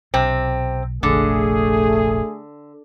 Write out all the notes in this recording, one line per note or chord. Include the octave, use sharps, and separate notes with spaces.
B1 C3 C4
F1 A#1 D3 A3 G#4